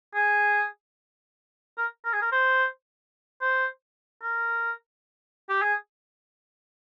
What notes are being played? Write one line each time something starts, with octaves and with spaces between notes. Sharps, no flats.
G#4
A#4
A#4
G#4
A#4
C5
C5
A#4
G4
G#4